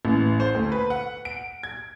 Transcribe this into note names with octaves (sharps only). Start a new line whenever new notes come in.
A1
C5
D2
B4
F#5
D7
G#6